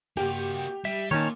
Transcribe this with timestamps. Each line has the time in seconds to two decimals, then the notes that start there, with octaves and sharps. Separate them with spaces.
0.17 A#3 F#4 G4
0.85 G3 E5
1.11 A#2 D#3 C#4 D#4 C#5 A5